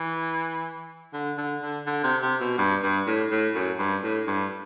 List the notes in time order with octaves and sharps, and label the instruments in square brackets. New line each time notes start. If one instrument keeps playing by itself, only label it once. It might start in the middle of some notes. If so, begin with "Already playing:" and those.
Already playing: [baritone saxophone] E3
D3
D3
D3
D3
C3
C3
B2
G2
G2
A2
A2
F#2
G2
A2
G2